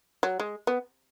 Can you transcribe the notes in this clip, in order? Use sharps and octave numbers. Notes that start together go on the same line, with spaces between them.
F#3
G#3
B3